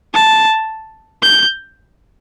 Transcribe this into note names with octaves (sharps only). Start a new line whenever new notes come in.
A5
G6